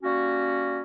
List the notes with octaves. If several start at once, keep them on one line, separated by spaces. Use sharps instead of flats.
G3 A#3 C#4 F#4